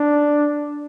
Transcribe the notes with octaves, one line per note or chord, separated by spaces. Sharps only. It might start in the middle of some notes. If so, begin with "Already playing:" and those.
Already playing: D4